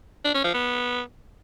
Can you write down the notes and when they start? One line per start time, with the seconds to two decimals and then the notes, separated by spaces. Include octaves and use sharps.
0.25 D4
0.35 C#4
0.44 F3
0.54 B3